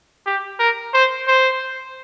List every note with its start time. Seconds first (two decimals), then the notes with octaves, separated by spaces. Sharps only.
0.26 G4
0.59 A#4
0.94 C5
1.28 C5